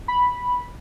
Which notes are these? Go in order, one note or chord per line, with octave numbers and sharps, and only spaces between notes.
B5